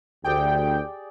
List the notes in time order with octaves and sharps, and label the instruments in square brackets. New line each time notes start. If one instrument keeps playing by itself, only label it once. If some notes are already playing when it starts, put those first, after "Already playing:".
[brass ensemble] D2 [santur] G4 G#4 D5 [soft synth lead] G5